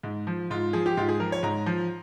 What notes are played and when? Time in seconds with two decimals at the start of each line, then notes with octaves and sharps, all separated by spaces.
0.03 G#2
0.27 F3
0.50 G#2 F4
0.73 F3 G#4
0.86 G4
0.97 G#2 F4
1.09 G#4
1.20 F3 A#4
1.32 C#5
1.43 G#2 A#5
1.66 F3